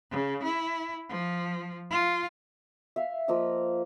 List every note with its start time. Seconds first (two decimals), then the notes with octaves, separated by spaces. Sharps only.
0.11 C#3
0.43 E4
1.09 F3
1.91 F4
2.96 E5 F5
3.28 F3 A#3 D#5 E6